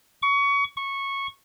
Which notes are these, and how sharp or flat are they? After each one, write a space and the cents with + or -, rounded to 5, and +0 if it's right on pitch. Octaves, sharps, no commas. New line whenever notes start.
C#6 +25
C#6 -10